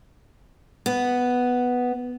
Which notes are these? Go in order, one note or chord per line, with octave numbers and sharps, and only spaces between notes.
B3